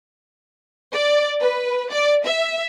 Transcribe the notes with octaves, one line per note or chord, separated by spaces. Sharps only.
D5
B4
D5
E5